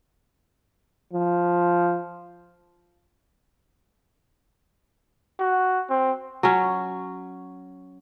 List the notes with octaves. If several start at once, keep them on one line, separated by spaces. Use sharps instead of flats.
F3
F#4
C4
F#3 C#4